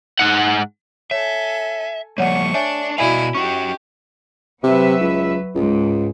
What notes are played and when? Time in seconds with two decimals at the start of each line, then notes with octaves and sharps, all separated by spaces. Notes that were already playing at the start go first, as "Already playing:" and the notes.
0.19 G#2 F#5
1.11 A4 C#5 E5 G#5
2.18 F3 G3 A3 A#3 C#5 D5 F#5 C#6
2.54 D4 C#5 D5 E5 G#5
2.98 B2 E4 F#4 D5 D#5 F5 G#5 B5
3.35 C#4 D#4 F#4 G4 C#6
4.63 C3 F#3 B4 E5
5.01 C#2
5.55 C#2 G#2